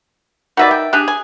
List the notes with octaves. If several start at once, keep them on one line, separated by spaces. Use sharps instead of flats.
D#3 F#4 B4 D5 E5
G5
D4 G4 G#4
G#5